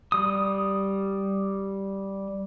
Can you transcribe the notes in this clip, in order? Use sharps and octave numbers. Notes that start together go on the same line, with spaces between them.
G3 D#6